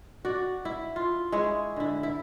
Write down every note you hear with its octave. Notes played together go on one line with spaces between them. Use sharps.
F#4 D5
E4
F4
G#3 E4 C#5
D3 E4
E4